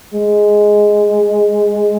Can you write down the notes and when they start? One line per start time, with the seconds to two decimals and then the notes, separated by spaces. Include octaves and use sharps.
0.14 G#3